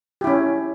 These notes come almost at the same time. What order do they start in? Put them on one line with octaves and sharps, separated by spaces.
G4 E4 C#4